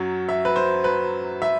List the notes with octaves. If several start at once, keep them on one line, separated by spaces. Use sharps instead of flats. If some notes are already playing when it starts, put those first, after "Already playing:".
Already playing: F#2 F#3
E5
B4
C5
B4
E5